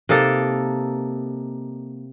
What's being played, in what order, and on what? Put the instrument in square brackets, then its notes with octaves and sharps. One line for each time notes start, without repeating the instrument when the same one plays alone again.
[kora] C3 A#3 D#4 A4